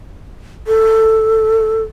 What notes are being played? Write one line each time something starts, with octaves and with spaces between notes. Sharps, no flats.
A4